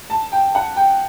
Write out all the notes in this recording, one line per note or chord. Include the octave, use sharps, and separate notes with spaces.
A5
G5
F#5
G5